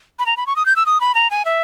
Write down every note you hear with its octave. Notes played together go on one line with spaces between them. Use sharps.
B5
A#5
B5
C#6
D#6
G6
E6
D#6
B5
A#5
G#5
E5